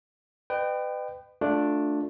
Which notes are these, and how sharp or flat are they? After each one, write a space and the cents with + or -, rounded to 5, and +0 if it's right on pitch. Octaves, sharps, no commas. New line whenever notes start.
B4 +30 D#5 -45 G5 +0
A3 +0 D4 +0 F4 +20